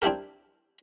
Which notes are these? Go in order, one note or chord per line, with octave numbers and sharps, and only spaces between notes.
C4 D4 E4 G4 A#4